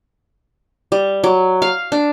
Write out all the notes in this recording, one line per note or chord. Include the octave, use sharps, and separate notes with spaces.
G3
F#3
F5
D4